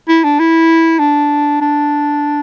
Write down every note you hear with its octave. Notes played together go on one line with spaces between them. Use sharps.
E4
D4
E4
D4
D4